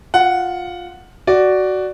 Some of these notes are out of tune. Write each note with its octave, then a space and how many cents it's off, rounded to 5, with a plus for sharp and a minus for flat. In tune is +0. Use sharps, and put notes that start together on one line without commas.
F4 +15 F#5 +0
F#4 +10 D5 +0